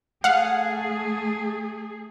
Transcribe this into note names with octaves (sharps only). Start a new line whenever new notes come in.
A3 G#4 F5 F#5